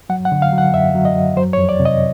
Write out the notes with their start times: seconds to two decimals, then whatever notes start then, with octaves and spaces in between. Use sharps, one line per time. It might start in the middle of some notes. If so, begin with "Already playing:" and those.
0.09 F#3 F#5
0.25 F#5
0.32 D3
0.42 F5
0.53 F#3
0.58 F#5
0.74 F#2 E5
0.95 F#3
1.05 D#5
1.16 F#2
1.37 F#3 C5
1.53 C#5
1.58 F2
1.69 D5
1.80 C3
1.85 D#5